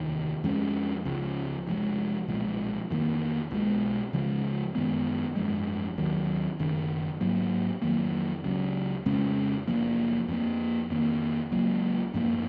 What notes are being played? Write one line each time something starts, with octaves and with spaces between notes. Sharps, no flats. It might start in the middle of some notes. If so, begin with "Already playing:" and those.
Already playing: F1 D#2 D#3
F2 F3 G#3 C#4
C#2 C#3 F3
F1 F2 F3 G#3
B1 A#2 F3 G#3
F2 D#3 A#3
B1 B2 G#3
C#2 C#3 F3 G#3
F#2 D#3 G#3 B3
G#1 F#2 F3 G#3
D#2 D#3 F#3
F#1 F#2 D#3
G#2 F#3 A#3
F2 D#3 F#3 A#3
C#2 C#3 F#3
F2 C#3 G#3 C#4
F#1 F#2 F3 A#3
F2 F3 A#3
F2 D#3 A#3
C#2 C#3 F#3 A#3
G#1 F#2 F3 A#3